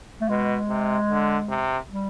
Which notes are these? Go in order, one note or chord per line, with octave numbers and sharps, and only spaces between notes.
A3
B2 G#3
C3
D3
C3
G3